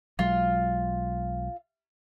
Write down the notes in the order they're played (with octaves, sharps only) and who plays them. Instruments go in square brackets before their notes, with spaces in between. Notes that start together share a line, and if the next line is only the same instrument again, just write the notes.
[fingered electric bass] B1 F#3 G#3 [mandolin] F4